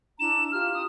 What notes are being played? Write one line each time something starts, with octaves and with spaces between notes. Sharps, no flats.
D4 E4 A#5 E7
F4 G4 F6
D#6